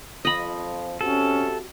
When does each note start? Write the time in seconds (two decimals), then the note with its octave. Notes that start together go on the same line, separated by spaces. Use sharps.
0.25 F2 F3 D#5 B5
1.01 C3 C#4 F#4 A4